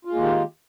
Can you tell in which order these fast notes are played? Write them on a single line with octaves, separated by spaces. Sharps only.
F4 G#3 A#3 D#3 G4